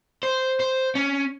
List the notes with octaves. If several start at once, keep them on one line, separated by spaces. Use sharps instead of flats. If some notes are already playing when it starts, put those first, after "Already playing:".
C5
C5
C#4